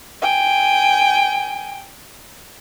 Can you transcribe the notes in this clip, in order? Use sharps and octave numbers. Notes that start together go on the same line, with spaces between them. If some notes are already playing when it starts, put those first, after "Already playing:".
G5 G#5